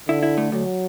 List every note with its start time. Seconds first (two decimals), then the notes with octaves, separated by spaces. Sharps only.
0.08 D3 E4
0.23 E4
0.38 A3
0.52 D2 F#3